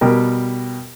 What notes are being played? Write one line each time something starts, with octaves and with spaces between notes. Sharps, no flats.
B2 G3 G4 A#4